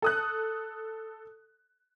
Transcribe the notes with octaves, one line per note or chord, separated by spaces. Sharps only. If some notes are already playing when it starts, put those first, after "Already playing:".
A4 D#6 F#6